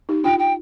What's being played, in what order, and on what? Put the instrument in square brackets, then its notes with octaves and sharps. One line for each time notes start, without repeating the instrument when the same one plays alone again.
[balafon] D#4 G4
[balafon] D4 F4 [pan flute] G5
[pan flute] G5